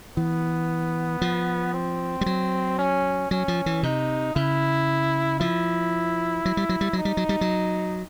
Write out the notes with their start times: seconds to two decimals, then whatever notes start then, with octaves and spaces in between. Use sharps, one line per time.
0.17 E3 B3
1.22 F3
1.74 C4
2.21 G3
2.26 F#3
2.78 C#4
3.31 F#3 C#4
3.48 F3
3.66 E3
3.83 C3 D#4
4.35 C#3 E4
5.40 F3 E4
6.45 F#3
6.57 G3
6.69 F#3
6.81 G3
6.93 F#3
6.98 D#4
7.05 G3
7.17 F#3
7.29 G3
7.41 F#3